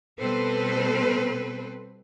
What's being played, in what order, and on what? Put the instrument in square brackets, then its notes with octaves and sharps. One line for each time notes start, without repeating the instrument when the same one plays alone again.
[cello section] B2 G3 C4 A4 B4 C5